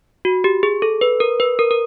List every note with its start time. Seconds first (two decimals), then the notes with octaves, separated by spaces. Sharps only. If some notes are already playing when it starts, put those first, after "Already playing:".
0.25 F#4
0.44 G4
0.63 G#4
0.82 A4
1.01 B4
1.20 A#4
1.40 B4
1.59 A#4
1.71 A#4